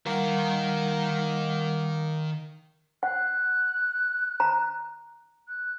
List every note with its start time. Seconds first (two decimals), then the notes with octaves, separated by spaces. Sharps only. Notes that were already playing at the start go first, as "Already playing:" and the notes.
0.06 D#3 G3 A#3 A#4 F#5
3.03 F#5 F#6
4.40 A#5
5.48 F#6